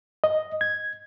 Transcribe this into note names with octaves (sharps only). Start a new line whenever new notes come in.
D#5
G#6